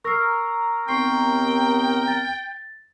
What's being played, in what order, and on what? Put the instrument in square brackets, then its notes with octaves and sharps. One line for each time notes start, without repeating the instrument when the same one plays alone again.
[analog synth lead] A#4 [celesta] C#6 E6 C7
[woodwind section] D#2 B3 C4 [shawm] G5 [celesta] C6 C#6 C7
[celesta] A6